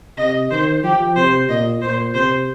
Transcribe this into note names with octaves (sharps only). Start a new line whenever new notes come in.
C3 D#5
D#3 C5
F3 G4
C3 C5
A#2 D#5
A#2 C5
C3 C5